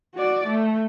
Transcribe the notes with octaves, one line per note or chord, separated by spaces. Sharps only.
F#4 D5
A3